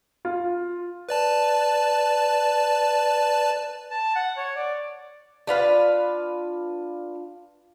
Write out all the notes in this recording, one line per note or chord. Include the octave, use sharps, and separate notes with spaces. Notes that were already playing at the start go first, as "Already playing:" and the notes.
F4
B4 D5 A5
A5
F#5
C#5
D5
D4 F4 B4 F5